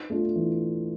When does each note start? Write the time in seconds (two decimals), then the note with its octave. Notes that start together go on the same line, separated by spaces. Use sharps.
0.10 A3 D4 F4
0.36 E3